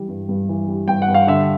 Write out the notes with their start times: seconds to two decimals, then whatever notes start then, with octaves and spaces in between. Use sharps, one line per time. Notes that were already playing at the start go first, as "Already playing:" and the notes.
Already playing: E3 G3
0.08 G2
0.29 G2
0.49 E3
0.68 G3
0.88 G2 G5
1.02 F#5
1.08 G2
1.14 F5
1.27 D3 E5